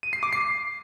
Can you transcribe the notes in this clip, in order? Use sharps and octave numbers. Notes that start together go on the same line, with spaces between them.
D#7
C7
D6
C7